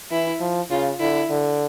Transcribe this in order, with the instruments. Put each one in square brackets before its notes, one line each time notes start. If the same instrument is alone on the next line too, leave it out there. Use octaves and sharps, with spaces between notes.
[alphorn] E3 [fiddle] E4
[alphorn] F3
[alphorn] C#3 [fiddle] F4
[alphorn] D3 [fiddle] E4
[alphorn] D3